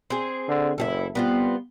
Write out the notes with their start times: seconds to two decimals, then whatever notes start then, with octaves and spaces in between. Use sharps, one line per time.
0.10 C4 G#4
0.48 D3
0.78 F#1 E4 G#4 A4
1.15 G3 B3 C4 F4